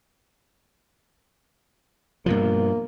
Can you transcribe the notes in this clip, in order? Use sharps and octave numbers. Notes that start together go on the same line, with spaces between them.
G2 B2 F3 A#3